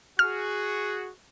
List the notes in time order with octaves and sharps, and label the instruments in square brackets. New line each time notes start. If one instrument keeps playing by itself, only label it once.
[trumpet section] F#4 G#4 [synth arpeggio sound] F6